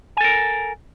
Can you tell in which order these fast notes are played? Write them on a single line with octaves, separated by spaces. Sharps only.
G#5 A4 A#4